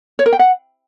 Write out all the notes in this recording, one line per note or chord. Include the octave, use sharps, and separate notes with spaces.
C#5
A#4
G5
F#5